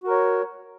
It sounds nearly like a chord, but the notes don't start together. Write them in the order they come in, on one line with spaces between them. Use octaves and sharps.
F#4 A#4 C#5